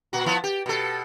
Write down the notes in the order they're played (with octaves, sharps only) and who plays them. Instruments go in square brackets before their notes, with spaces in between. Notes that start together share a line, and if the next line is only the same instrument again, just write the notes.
[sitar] A#2 F#4
F3 B3 E4
G4
B2 A4